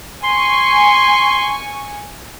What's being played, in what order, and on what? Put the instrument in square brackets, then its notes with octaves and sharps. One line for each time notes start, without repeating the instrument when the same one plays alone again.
[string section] G#5 C#6 [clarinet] C6